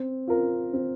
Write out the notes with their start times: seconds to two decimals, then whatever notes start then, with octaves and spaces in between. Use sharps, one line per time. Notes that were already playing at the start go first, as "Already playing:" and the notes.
Already playing: C4
0.28 F4 A#4
0.73 C4